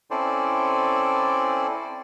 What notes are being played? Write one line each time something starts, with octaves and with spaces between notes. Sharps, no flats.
C4 C#4 E4 A4 C5 D5